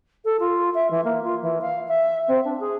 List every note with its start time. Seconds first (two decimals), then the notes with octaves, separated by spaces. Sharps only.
0.24 A4
0.39 F4
0.74 E5
0.90 E3
1.04 A#3
1.23 F4
1.41 E3
1.61 F5
1.87 E5
2.27 C4
2.44 D4
2.59 G#4